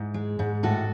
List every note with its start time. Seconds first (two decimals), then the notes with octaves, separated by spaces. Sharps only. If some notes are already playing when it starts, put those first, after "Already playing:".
Already playing: G#2 E4 G#4
0.14 G#3
0.39 G#2
0.63 A2 F#4 A4